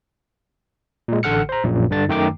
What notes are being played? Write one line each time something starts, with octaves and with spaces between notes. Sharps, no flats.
A#2 G#3
A1 D3 A4 F#5 F6 C#7
C5 A#5
A#1 F#2 A#2
G2 D3 D4 A6
F#2 D#3 A3 G5 A#5 D6